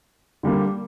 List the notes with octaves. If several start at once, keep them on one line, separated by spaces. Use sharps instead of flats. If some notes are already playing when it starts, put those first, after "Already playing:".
D3 G3 A#3